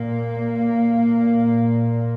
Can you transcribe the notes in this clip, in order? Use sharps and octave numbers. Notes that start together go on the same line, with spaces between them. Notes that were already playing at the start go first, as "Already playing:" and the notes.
Already playing: A#2 A#3
A#2